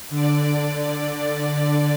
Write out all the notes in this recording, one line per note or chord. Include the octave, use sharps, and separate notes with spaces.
D3 D5